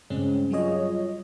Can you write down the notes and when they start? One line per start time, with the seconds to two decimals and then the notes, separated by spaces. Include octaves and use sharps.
0.10 G2 C#3 G#3 C4 C#4
0.51 F#3 G3 F4 G#4 C#5 D#5